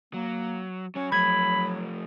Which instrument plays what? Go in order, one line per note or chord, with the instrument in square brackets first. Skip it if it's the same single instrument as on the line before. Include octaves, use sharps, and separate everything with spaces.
[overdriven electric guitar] F#3 [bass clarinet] A#3
[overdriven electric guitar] F#3 C#5 [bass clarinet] C#4
[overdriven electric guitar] F3 A3 [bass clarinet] F#3 [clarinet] B5 [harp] G#6